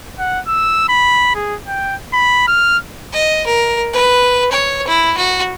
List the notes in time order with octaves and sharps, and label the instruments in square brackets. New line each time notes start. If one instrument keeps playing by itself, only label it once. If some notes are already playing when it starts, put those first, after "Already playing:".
[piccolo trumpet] F#5
E6
B5
G#4
G5
B5
F6
[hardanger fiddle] D#5
A#4
B4
C#5
E4
F#4